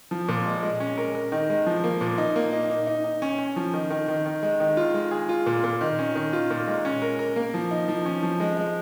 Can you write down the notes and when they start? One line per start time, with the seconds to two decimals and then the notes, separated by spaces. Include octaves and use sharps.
0.11 F3
0.28 A#2
0.46 G#3
0.63 G#3
0.80 C#4
0.97 A#4
1.15 A#4
1.32 D#3
1.50 G#3
1.66 F3
1.84 A#3
2.01 A#2
2.18 D#4
2.36 A#3
2.52 D#4
2.70 D#4
2.87 D#4
3.04 D#4
3.22 C#4
3.39 C#4
3.56 F3
3.74 D#3
3.90 D#3
4.08 D#3
4.26 D#3
4.43 G#3
4.60 D#3
4.77 F4
4.94 G#3
5.11 G#4
5.29 F4
5.46 A#2
5.64 A#2
5.81 D#3
5.99 C#4
6.15 D#3
6.33 F4
6.50 A#2
6.67 G#3
6.85 C#4
7.02 A#4
7.19 A#4
7.36 A#3
7.54 F3
7.71 D#4
7.88 F3
8.05 C#4
8.23 F3
8.40 G#3
8.57 G#3